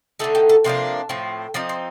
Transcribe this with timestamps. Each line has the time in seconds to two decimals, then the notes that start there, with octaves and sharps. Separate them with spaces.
0.19 D3 A3 D#4 A4
0.35 G4
0.49 A4
0.64 C3 F3 A#3 D4 C5
1.09 A2 F3 C4
1.54 F3 C4 D#4 D5
1.69 C5